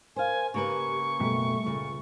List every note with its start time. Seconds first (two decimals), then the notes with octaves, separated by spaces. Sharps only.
0.16 A#4 C5 F5 G#5
0.54 C#3 A#3 G4 B4 C#6
1.20 F#2 B2 G3 A3
1.66 C#2 A#2